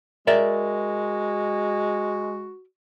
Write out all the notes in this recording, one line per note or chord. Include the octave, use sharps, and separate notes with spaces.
G#3 F#4 A#4 D5 E5